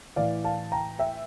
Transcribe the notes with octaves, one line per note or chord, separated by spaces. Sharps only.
A2 E3 D5 F5
F5 A5
G5 A#5
E5 G5